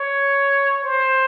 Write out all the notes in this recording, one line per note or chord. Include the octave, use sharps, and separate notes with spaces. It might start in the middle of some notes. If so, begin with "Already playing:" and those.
Already playing: C#5
C5